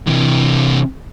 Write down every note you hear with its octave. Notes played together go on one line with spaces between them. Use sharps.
C3 E3